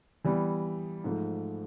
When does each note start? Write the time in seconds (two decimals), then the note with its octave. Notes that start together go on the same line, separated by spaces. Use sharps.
0.24 E3 G3 B3
1.04 G#2 F3 A3